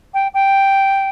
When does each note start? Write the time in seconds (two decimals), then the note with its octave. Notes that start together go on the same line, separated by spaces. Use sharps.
0.14 G5
0.34 G5